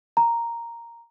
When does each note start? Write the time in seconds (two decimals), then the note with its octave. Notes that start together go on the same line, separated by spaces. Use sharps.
0.17 A#5